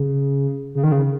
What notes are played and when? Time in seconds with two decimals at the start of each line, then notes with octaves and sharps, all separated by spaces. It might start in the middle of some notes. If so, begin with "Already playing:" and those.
Already playing: C#3
0.75 C#3
0.83 D#3
0.92 C#3